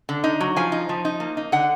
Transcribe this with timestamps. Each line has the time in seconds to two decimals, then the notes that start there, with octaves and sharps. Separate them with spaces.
0.09 D3
0.24 D#4
0.41 F#3
0.57 F3 G#5
0.72 D#4
0.89 F3
1.05 D#4
1.20 A#3
1.37 D#4
1.52 D3 F#5